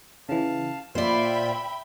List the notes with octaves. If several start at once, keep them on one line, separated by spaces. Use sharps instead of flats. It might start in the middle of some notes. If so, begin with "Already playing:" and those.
C#3 E3 F5 A5
A#2 F4 C5 D5 E5 G5 B5